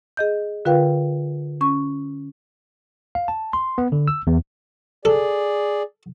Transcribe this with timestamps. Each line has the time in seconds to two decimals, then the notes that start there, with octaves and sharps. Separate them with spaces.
0.17 G#4 D#5 G6
0.65 D3 F4 A#4 B4 F5 G5
1.61 C#4 C#6
3.15 F5
3.28 A5
3.53 C6
3.78 B3
3.92 D3
4.08 E6
4.27 E2
5.05 G#4 A4 D5